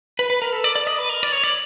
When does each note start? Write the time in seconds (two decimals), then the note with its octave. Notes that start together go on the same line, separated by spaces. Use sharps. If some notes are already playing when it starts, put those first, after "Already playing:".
0.19 B4
0.30 B4
0.42 A#4
0.53 A4
0.64 D5
0.75 D5
0.87 D#5
0.98 B4
1.09 A#4
1.23 D5
1.32 C#5
1.44 D5